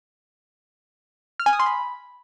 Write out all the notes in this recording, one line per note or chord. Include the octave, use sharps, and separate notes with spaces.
F6
G#5
D#6
C6
B5